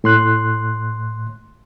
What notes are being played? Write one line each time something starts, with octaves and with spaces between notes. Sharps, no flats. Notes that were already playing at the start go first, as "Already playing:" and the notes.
A2 C6 F#6